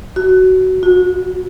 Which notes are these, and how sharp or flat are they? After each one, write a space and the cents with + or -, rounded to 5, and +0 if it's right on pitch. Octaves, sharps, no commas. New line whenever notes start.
F#4 +15
F#4 -35